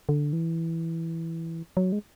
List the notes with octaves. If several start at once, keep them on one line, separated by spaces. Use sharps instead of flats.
D3
E3
F#3
G#3